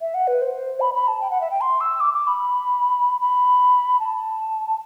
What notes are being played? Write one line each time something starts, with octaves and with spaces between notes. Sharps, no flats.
E5
F#5
B4
C5
B5
B5
A5
G5
F#5
E5
G5
C6
E6
D6
D6
B5
B5
A5